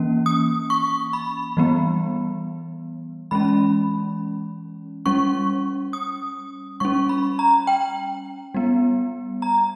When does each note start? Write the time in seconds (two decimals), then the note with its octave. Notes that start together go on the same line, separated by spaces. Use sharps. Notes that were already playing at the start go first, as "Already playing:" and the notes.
Already playing: E3 A#3 C#4
0.26 D#6
0.70 C#6
1.13 B5
1.57 E3 G3 B3
3.31 E3 G#3 C#4 B5
5.06 G3 C#4 C#6
5.93 D#6
6.80 G3 C#4 C#6
7.09 B5
7.39 A#5
7.67 G5
8.54 G3 B3
9.42 A#5